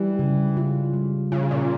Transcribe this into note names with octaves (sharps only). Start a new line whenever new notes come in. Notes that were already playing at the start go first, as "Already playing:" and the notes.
Already playing: E3 G3
C#3
F4
G3
C#3 F4
A#2